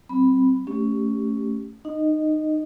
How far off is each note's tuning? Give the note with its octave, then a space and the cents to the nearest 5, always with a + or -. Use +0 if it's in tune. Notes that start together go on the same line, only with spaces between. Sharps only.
F#3 +40 C4 +0 B5 +0
A3 +0 C#4 +10 G4 +0
D#4 -20 D#5 +0